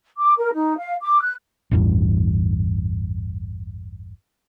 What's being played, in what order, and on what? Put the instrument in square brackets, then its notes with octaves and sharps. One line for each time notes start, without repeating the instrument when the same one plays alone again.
[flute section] D6
A#4
D#4
F5
D6
F#6
[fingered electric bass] A1 E2 G2